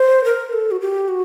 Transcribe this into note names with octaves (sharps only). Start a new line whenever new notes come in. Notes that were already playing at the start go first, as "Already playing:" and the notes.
Already playing: C5
A#4
A4
F#4
G4
F#4